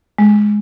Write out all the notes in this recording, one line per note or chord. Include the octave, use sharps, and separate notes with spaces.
G#3